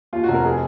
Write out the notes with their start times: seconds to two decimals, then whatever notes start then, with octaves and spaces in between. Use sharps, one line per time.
0.13 D#2 F4
0.24 F#4
0.29 F1
0.34 A#4
0.45 G#4